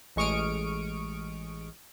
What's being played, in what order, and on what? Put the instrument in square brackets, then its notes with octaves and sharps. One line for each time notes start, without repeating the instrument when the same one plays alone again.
[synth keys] A1 G#3 C#6 D#6 F6 D7